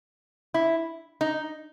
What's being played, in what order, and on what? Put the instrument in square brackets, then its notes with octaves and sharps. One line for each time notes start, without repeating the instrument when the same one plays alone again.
[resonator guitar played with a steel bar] E4
D#4